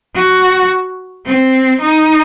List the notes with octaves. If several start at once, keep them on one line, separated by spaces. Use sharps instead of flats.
F#4
C4
D#4